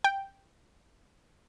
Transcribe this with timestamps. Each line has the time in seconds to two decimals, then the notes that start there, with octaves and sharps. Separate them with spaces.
0.04 G5